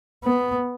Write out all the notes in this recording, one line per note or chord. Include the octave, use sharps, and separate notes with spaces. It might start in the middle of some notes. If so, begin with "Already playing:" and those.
B3